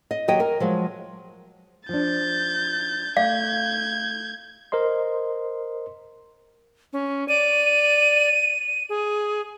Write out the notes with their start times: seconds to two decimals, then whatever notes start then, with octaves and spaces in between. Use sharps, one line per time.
0.11 D#5
0.28 D#2 F#3 G4 D#5 G5
0.40 A#4
0.60 F3 F#3 G#3
1.89 F3 D4 G6 A6
3.17 A3 F5 G6 G#6
4.72 A#4 C5 D#5 C6
6.93 C#4
7.28 D5 D#7
8.89 G#4